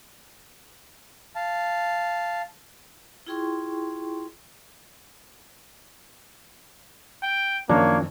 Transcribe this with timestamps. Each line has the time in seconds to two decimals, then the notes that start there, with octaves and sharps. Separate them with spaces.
1.36 F5 A5
3.27 E4 F4 G#4 G5 C6 C#6
7.22 G5
7.70 F#2 D#3 F3 A#3 D4 C#5